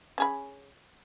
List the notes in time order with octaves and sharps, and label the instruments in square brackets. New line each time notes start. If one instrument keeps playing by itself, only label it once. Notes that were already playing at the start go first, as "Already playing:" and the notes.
[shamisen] C#4 G#4 B5